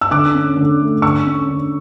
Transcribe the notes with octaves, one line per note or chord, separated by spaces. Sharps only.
E6
D3 D6 F#6
C#4
D3
A3
D3 C#6 E6
C#4
D3